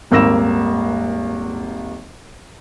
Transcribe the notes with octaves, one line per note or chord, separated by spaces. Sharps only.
D#1 G#1 A#3 E6 A#6 E7